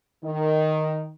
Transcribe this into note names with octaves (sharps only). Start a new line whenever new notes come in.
D#3